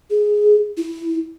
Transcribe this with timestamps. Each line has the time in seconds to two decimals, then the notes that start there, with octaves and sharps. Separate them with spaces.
0.10 G#4
0.77 E4